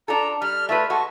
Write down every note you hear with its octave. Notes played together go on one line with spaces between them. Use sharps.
D4 F4 A4 A#5
G3 F6
A3 F4 B4 E5
G#3 F#4 A4 C#6